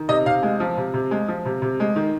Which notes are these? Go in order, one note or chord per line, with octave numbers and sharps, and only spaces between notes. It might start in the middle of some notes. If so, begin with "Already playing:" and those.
Already playing: D#3
C3 D#5
C3 F5
G#3
F3
C3
C3
G#3
F3
C3
C3
G#3
D#3